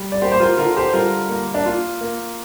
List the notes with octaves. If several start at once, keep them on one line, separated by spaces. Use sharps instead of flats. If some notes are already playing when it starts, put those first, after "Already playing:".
Already playing: G3
D5
A#3 G4 C5
C5
F4 A#4
D3 F4 A#4
G4 C5
G3 F4 A#4
A#3
D4
A#3 F4
A#3